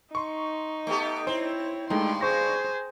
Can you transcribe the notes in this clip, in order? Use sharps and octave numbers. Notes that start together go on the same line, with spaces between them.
D#4 C6 C#6
A3 B3 G4
C4 E4 C5 C#5
G2 G#3 A3 D#4 G5 C6
G#4 C5 C#6 A#6